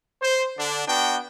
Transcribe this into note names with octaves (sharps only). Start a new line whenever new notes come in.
C5
D3 D4
B3 D4 F#4 G5